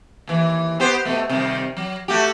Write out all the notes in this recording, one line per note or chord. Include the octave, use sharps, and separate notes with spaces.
D#2 E3
B3 G4 C5
B2 A3
C3 D#3 G3
F#3
A3 F#4 G4